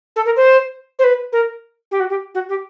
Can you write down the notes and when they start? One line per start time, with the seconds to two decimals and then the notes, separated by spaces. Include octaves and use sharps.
0.16 A4
0.26 A#4
0.36 C5
0.99 C5
1.04 B4
1.33 A#4
1.91 G4
2.00 F#4
2.10 G4
2.35 F#4
2.49 G4